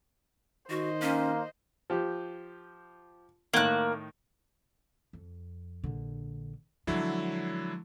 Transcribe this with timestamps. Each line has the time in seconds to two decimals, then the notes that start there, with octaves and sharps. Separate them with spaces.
0.70 D#3 F#4 C5 D#5
1.02 A#3 C#4
1.90 F3 G4
3.53 A2 D#3 A#3 F#6
5.13 F2
5.84 A#1 D3
6.87 D3 F3 F#3 G#3 E4